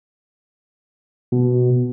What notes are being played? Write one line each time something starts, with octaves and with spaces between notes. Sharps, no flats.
B2